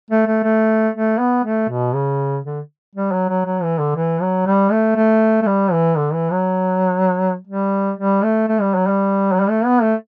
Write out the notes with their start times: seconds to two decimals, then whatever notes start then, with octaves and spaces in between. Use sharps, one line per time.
0.11 A3
0.27 A3
0.44 A3
0.94 A3
1.19 B3
1.45 A3
1.70 B2
1.94 C#3
2.45 D3
2.95 G3
3.12 F#3
3.29 F#3
3.45 F#3
3.63 E3
3.79 D3
3.96 E3
4.21 F#3
4.46 G3
4.72 A3
4.96 A3
5.43 A3
5.47 G3
5.72 E3
5.97 D3
6.14 E3
6.31 F#3
7.47 G3
7.98 G3
8.24 A3
8.48 A3
8.61 G3
8.75 F#3
8.87 G3
9.32 F#3
9.40 G3
9.49 A3
9.66 B3
9.82 A3